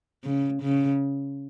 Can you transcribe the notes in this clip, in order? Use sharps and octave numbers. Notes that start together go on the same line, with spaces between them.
C#3
C#3